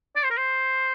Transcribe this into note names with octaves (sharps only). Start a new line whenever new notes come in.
D5
C5
A#4
C5